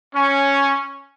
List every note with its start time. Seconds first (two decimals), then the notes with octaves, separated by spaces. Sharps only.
0.15 C#4